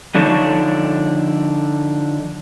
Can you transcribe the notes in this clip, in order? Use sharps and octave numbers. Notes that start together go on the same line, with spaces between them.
D3 F3 D4 D#4 A4 C#5